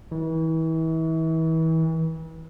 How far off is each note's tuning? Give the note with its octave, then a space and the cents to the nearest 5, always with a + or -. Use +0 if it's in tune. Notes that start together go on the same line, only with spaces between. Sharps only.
E3 -35